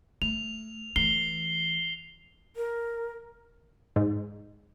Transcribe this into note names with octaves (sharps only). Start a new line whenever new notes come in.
A3 F7
E3 A3 C7 G7
A#4
G#2